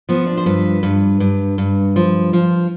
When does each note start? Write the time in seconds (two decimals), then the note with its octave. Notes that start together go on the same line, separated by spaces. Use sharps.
0.09 F3 B3
0.27 D4
0.37 C5
0.46 G2 B4
0.83 G2
1.20 G2
1.58 G2
1.96 F3
2.33 F3